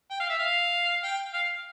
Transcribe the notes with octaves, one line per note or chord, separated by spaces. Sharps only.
G5
F5
E5
F5
G5
F5